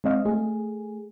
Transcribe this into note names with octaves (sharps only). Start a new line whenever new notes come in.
G#3 C4 D#5 F5
A3 G#4